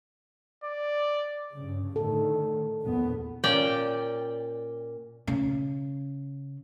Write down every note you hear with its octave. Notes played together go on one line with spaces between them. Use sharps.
D5
G2 C#3
A2 D3 D#3 A4
A#1 E2 B3
A#2 C#4 D5 G5
C#3